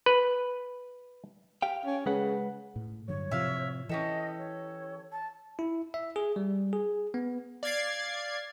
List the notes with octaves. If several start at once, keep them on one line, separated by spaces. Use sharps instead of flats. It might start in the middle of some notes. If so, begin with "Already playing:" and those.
B4
G4 F5 G5
C#4
C#3 G#3 B4 F#5
A2
G2 D3 F#3 C#5
A2 C3 F3 E5 F5
E3 C#4 G4 A4 D#5
C#5
A5
E4
E5
G#4
G3
G#4
B3
D5 F5 G#6 A6 C7